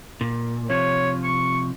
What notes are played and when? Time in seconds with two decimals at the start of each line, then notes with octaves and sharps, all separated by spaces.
0.21 A#2
0.70 C3 F3 C#5
1.24 C#6